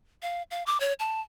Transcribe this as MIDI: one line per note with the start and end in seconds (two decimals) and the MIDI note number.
0.22 0.42 77
0.51 0.63 77
0.66 0.80 86
0.80 0.93 73
0.99 1.21 81